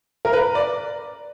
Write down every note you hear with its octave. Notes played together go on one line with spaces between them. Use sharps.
A#4
B4
D5